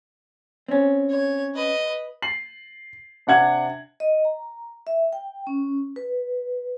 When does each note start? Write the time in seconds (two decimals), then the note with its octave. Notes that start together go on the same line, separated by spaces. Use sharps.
0.68 C4 C#4
1.10 C#5
1.54 B4 D#5
2.22 C7 F#7
3.27 C3 D4 F#5 G#6 F#7
4.00 D#5
4.25 A#5
4.87 E5
5.13 G5
5.47 C#4
5.96 B4